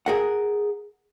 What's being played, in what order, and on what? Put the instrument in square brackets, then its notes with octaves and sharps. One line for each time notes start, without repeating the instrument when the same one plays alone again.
[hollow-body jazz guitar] G#4 A#4 F#5